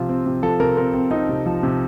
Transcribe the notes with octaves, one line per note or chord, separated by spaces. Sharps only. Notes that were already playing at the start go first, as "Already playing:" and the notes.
Already playing: C3 F3 F4
C4
C3
F3 A4
C3 A#4
C4 A#4
C4
C4 D#4
C3
F3
C3